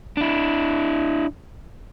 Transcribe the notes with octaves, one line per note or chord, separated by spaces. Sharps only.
D4 E4